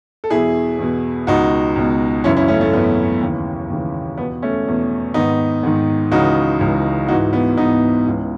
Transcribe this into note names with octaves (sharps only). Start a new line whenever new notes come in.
A4
E2 B2 E4 G#4
E2 B2
C#2 B2 D#4 F#4
C#2 B2
F#2 C#3 E3 C#4 E4
C#4 E4
A3 C#4
A3
F#2 C#3 E3 B3
D#2 C#3 E3
D#2 C#3 E3
E2 B2 B3
A3 C#4
E2 B2
G#2 D#3 B3 D#4
G#2 D#3
C#2 C#3 E3 D#4 F#4
C#2 C#3 E3
G#2 E3 D#4 F#4
B3
G#2 E3 B3 D#4
C#2 C#3 E3